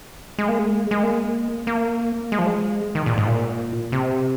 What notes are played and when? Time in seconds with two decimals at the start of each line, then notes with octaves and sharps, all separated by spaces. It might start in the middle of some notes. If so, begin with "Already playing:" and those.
0.38 G#3
0.49 A#3
0.59 G#3
0.91 G#3
1.03 A#3
1.67 A#3
2.32 G#3
2.39 F3
2.47 G#3
2.95 D#3
3.06 A#2
3.18 G#2
3.27 A#2
3.92 C3